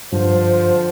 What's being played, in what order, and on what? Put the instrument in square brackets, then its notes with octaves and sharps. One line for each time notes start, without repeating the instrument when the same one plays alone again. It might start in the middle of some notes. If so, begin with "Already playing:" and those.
[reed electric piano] G2 [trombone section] D3 F3 C5